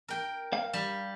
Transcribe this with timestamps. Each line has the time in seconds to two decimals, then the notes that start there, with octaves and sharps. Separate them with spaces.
0.08 A#4 G5
0.53 F5
0.73 G3